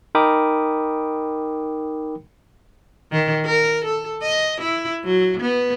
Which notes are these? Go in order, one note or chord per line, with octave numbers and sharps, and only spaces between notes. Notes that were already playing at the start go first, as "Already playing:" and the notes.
D#4 A#4 G5 B5 D6 D#6
D#3
A#4
A4
D#5
E4
F#3
B3